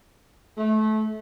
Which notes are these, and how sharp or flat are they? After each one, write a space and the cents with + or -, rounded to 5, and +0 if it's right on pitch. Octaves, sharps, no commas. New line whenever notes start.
A3 -25